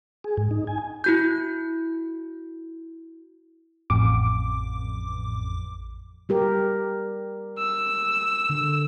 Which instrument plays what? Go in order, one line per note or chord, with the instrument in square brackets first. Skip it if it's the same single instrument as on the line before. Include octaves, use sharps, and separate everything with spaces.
[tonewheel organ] G#4
G#2
D#4
G#5
[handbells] E4 F#4 G6
[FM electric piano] A1 F2 D6
[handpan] G3 G4 A#4
[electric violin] E6
[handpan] D3